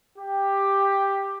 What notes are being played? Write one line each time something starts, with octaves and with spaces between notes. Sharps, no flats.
G4